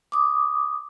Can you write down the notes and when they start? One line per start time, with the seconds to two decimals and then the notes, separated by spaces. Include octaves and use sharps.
0.12 D6 D#6